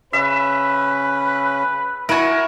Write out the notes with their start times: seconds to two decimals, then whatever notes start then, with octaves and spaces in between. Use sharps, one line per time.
0.13 C#3 C#4 B4 E5
2.09 E4 F#4 A#4 G#5